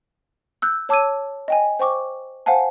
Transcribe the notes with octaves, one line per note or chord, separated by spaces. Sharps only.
E6 F#6 G6
C#5 A5 D6 E6 G#6 D#7
D#5 G5 G#5
C5 G5 C#6 D6
C5 F5 F#5 G#5 A5